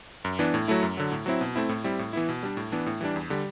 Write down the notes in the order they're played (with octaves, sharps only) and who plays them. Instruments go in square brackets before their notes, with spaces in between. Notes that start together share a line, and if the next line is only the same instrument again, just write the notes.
[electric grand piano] F#2
E3 B3 D4
A2
F#3 A3 E4
F#2
D3 F#3
A2
F#3 C4 E4
B2
A3 C4 E4
A2
G3 C4 E4
A2
E3 B3 E4
B2
G3 D4
A2
E3 B3 D4
A2
E3 G3 D4
E2
D3 G3